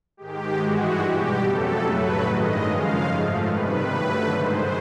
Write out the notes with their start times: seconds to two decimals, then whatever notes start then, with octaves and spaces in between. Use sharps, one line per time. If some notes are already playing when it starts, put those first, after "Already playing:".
0.17 G#2 D#3 G#3 G4
0.58 G2 E3 G#3 F#4
0.99 B2 G3 G4
1.41 F2 C#3 F#3 A3 A4
1.82 A2 F#3 A3 B4
2.23 G2 D#3 G#3 D#5
2.65 F#2 C#3 F3 G#3 F5
3.05 G#2 F3 A3
3.46 C3 D#3 G3 B4
3.88 G2 D3 F#3 A3
4.29 G#2 D#3 G#3 C5